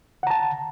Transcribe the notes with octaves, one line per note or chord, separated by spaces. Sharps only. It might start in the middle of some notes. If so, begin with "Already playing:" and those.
F#5 A5 A#5